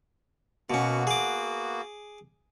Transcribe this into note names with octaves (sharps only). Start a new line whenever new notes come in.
B2 A#3 B3 C#4 F#4
G#4 D6